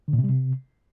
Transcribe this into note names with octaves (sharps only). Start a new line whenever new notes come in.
D3
A#2
C3
G3
C3